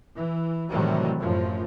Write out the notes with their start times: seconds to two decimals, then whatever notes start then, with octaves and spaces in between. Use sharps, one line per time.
0.16 E3
0.71 A2 C3 D#3 E3 F#3 G3
1.19 F#2 A2 F3